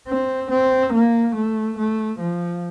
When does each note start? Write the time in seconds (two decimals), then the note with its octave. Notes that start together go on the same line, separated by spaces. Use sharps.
0.08 C4
0.51 C4
0.93 A#3
1.35 A3
1.78 A3
2.19 F3